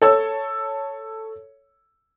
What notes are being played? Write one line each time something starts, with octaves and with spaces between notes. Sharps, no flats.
A4 C#5 E6